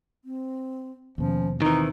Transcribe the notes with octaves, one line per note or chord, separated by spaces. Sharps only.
C4
D#2 B2 F3 C#4
D#3 E3 C4 D#4